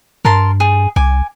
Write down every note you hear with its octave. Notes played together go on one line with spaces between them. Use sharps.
G2 A#4 A5 C6
G#4
C2 G#5 D6